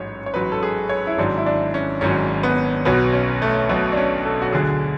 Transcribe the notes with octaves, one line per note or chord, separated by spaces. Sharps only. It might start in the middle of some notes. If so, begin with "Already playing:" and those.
Already playing: A1 G#2 F#3 C#5
C#5
A1 G#2 F#3 B4
A4
G#4
C#5
E4
G#1 G#2 F#3 D4
E4
D4
C#4
G#1 G#2 F#3 C#4
B3
B1 B2 F#3 B3
C#4
A3
B1 B2 F#3 B3
D4
C#4
A4
F#4
D2 D3 F#3 G#4